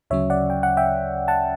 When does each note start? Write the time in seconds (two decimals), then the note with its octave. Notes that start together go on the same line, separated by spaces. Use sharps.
0.10 D2 C#3 F#3 C#4 C#5 E5
0.30 D5 F#5
0.50 G5
0.63 F#5
0.77 E5 G5
1.28 F#5 A5